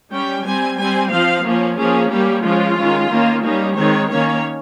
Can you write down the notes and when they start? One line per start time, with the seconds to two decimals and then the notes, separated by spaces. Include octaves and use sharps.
0.11 G3 C#4 G5
0.44 G3 C4 G#5
0.77 G3 C4 G#5
1.10 F3 C4 F5
1.44 F3 A#3 C#4
1.77 F3 A#3 C#4 G#4
2.09 G3 A#3 C#4 G4
2.43 F3 G#3 C#4 F4
2.77 D#3 G#3 C#4
3.10 D#3 A#3 C#4
3.42 G3 A#3 C#4 D#4
3.76 D#3 G#3 C4 C#5
4.09 D#3 A#3 C#4 C#5